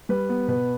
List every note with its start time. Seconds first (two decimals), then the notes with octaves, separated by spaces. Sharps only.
0.09 G3 B4
0.29 B3
0.48 B2 B4